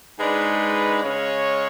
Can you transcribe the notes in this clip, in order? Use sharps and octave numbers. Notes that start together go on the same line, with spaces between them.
G#2 G#3 D4 B4
C#3 G#3 C#4 C#5